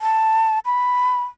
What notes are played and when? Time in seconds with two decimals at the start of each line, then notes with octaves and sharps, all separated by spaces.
0.01 A5
0.66 B5